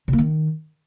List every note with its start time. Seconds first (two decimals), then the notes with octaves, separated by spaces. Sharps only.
0.08 C3
0.13 A#3
0.18 D#3